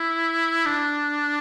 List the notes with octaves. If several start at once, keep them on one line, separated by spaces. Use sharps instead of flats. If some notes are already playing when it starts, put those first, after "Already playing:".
Already playing: E4
D4